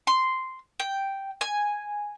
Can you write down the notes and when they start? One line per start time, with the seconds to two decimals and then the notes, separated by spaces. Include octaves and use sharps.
0.07 C6
0.80 G5
1.41 G#5